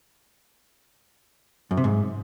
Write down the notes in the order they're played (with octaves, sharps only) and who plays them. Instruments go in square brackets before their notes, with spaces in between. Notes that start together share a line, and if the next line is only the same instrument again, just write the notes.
[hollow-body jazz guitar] F#2
C3
G#2